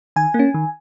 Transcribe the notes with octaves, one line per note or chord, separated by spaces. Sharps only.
D#3 G#5
A#3
C#4
D#3